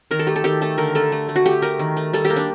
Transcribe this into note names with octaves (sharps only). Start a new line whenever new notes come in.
D#3 A#4
A4
A3 G4
A4
D#3 G4
A3 A4
D3 A#4
A3 A4
A3
A3
F#4
A3 G4
A3 A#4
D#3
A3
G3 A4
G4
A#3
D4